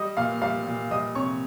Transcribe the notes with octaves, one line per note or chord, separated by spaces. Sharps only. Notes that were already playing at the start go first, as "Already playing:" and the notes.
Already playing: G3 D#5 D#6
A#2 F5 F6
G3 F5 F6
A#2
G3 D#5 D#6
C3 C#5 C#6